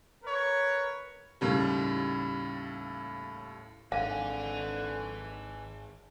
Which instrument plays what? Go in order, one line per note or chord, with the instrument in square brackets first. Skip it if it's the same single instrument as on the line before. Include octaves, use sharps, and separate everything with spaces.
[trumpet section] A#4 B4 C#5
[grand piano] D#2 A2 C#3 G3
[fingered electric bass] G#1 [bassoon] D3 [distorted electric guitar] B4 G#5 [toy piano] F5